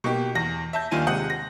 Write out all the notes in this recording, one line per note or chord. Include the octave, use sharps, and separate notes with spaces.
B2 A#3 D#4 G4
E2 A#6
E5 A5 G6
D#2 D#3 D4 F4 G#5 D#7
C3 G#3 F#5 D#6 G6
A#6